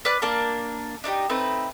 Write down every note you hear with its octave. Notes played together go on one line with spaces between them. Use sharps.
B4 D5 F#6
A#3 D4 A#4 A5
D4 D#4 F#4 G4
A3 C4 D#4 B4